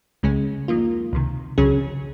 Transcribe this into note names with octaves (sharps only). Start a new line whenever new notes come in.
C#2 C#3 G#3 C#4
F2 D#3 A#3 F4
C#2 C3 D#3
C#2 C#3 F#3 C#4 G#4